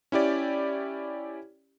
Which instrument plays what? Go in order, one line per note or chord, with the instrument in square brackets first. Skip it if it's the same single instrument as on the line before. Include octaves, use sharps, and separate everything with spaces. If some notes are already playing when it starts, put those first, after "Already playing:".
[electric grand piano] C#4 E4 G4 D5